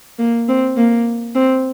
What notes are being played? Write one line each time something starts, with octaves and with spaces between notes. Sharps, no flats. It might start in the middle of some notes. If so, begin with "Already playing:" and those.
A#3
C4
A#3
C4